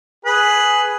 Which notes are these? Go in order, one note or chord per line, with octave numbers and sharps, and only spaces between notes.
G#4 B4